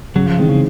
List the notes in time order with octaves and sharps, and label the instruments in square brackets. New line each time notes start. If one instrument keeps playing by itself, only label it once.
[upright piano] C#3 [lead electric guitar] F#3
[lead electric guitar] F3
[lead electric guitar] D#3 [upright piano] E3 G#3 C4 D#4
[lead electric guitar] C#3